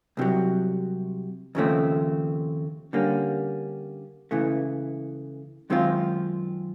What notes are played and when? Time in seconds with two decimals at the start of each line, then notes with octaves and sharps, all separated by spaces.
0.17 C2 C3 D#3 F#3
1.55 D#2 C#3 F3 A3 C4
2.93 D3 G3 A#3 C#4
4.31 C#2 C#3 E3 A3
5.70 F#2 D#3 G#3 C4 F4